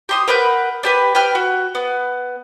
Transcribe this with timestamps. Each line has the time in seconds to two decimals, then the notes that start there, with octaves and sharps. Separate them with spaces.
0.09 G4 C6 D#6
0.28 A#4 B4 F#5 G6
0.83 D4 G4 B4
1.15 B4 G5 F6
1.35 F#4
1.75 B3